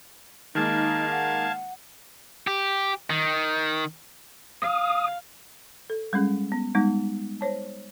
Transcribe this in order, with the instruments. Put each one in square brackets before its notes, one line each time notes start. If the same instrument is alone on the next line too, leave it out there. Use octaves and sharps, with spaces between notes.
[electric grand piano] D#3 G#3 A#3 [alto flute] D#4 [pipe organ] F5 A5 G#6
[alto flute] F#5
[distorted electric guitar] G4
D#3
[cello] F5 [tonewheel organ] D#6
[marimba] A4
G3 G#3 C#4 G#4
B3
G3 G#3 B3 D#4
C5 C#5 A5